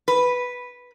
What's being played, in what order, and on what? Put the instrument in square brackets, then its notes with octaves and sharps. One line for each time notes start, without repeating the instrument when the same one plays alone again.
[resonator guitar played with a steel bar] B4